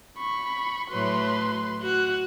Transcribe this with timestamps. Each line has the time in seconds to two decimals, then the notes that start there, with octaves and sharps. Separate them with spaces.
0.18 B5 C#6
0.90 A2 F#3 B4 C6
1.83 F#4 F#6